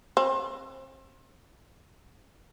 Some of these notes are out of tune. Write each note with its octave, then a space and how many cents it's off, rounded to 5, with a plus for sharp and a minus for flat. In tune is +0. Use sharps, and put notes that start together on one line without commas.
C4 +35